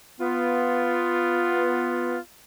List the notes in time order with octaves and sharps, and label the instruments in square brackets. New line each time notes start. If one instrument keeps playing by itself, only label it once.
[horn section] B3 F4